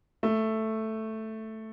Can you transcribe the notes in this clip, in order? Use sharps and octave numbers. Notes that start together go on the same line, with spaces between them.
A3